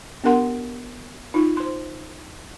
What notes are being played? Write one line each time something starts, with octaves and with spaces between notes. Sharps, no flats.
B3 D4 G4 A#4 F#5 C6
D#4 F4
C5 C6